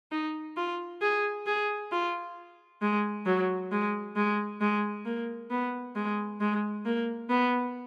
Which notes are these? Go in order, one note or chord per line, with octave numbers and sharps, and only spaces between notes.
D#4
F4
G#4
G#4
F4
G#3
F#3
G#3
G#3
G#3
A#3
B3
G#3
G#3
A#3
B3